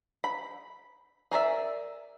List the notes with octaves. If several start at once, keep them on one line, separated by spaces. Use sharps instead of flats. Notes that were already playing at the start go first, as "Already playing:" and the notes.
B5
G#4 A#4 D5 E5